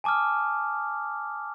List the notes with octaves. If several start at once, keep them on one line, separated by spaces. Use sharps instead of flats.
G#5 A5 D6 D#6 F6